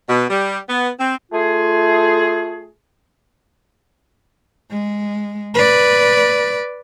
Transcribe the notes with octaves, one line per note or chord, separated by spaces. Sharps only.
B2
G3
B3
C4
A3 F4 G#4
G#3
B4 D5